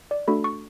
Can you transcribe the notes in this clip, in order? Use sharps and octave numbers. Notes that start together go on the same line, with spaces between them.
D5
A3 D4 F#4 A4 B5
C#6